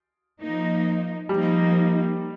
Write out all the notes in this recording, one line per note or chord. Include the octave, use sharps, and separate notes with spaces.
F3 A#3 D#4
F3 G3 A#3 D#4